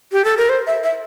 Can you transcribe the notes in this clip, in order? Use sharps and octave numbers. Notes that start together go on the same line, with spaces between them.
G4
A4
A#4
C5
E5
E5